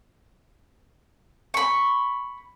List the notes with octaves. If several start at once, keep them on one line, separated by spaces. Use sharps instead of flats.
B5 C#6